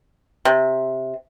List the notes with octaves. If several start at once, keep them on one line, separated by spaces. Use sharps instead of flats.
C3